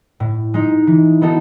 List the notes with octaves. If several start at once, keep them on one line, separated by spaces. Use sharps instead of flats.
A2
G#3 D#4
E3
B3 D#4 F#4 A4